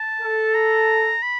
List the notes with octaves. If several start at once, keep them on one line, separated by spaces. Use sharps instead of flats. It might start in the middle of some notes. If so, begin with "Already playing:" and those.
Already playing: A5
A4
A#5
B5